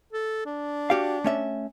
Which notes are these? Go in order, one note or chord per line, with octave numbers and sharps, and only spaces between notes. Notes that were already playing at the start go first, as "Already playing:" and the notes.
A4
D4
F#4 G4 F5
A3 C#4 E5